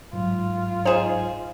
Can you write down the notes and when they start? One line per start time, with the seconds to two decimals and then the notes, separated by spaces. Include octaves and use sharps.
0.13 G#2 F#3 F4
0.85 D#4 G#4 C5 E7